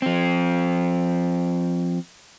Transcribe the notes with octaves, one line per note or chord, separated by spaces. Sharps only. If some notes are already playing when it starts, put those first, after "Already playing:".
F3 C4